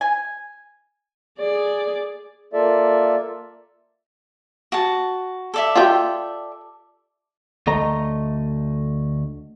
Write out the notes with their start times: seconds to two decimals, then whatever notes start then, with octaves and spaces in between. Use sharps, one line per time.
0.01 G#5
1.39 G#4 D5
2.53 A#3 F4 A4 D5 E5
4.72 F#4 A5
5.54 A4 D5 E5
5.75 F4 G4
7.67 D2 A3 D#5 A#5